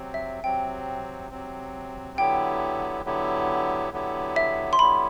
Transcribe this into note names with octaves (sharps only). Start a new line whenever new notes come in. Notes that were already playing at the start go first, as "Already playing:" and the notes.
Already playing: C3 F#3 C4
E5
C3 F#3 C4 G5
C3 F#3 C4
D3 F#3 B3 E4 G4 G5
D3 F#3 B3 E4 G4
D3 F#3 B3 E4 G4
E5
C6
D3 F#3 B3 E4 G4 B5